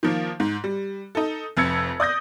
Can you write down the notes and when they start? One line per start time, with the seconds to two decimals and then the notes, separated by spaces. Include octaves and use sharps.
0.03 D#3 F3 A#3
0.40 G#2
0.64 G3
1.15 D#4 A4
1.57 F1 F2 E6 G#6 C#7
2.00 D5 D#6 G6 A#6